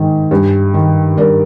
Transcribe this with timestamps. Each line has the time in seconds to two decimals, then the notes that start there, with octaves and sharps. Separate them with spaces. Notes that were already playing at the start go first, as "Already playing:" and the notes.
Already playing: G#2 D#3
0.31 G2
0.74 D#3
1.17 G2 A#4 D5